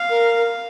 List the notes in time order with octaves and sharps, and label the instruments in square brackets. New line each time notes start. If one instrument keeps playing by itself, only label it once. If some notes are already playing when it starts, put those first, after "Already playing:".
Already playing: [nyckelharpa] F5
[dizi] A#4